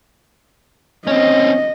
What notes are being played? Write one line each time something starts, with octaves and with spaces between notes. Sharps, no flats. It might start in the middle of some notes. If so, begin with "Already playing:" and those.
C4 C#4 D#5